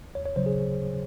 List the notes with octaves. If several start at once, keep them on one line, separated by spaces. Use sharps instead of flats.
D#2 C#5
C#5
C#3 F#3 C5
G#4